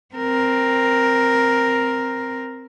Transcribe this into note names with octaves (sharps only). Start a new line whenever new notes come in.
C4 A#4